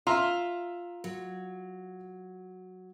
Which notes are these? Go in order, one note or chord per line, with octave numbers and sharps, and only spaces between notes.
F4 E5 A#5 C6
F#3